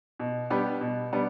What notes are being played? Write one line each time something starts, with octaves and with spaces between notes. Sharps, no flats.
B2
G3 B3 D4 G4
B2
G3 B3 D4